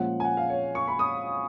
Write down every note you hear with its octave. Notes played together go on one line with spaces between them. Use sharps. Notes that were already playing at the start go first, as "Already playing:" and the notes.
Already playing: A#2 F3 G#3 C#4 F#5
G#5
F#5
F5
C#5
C#6
B5
D#6